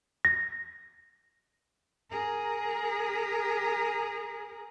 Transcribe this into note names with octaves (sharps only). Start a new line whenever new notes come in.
A#6
G#4 A#4